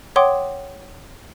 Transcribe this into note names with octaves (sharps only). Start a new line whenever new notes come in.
C#5 F#5 G5 C6 D6 D#6